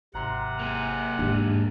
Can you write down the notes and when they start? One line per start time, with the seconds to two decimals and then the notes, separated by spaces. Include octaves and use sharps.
0.14 G#1 C3 F#5 A#5 C6
0.59 A#3 G#4
1.18 E2 G#2 D4 G4